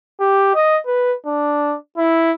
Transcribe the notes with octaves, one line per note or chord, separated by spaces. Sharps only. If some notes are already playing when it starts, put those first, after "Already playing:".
G4
D#5
B4
D4
E4